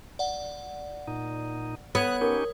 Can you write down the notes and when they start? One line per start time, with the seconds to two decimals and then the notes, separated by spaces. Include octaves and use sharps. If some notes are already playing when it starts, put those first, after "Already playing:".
0.19 D5 F#5
1.07 A#2 D#4
1.95 B3 C#5 D#6 F#6 G#6
2.21 C#4 D#4 G4 A#4